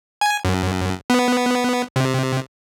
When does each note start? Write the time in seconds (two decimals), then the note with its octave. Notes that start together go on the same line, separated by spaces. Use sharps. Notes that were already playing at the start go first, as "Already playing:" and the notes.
0.21 G#5
0.45 F#2
1.10 B3
1.96 C3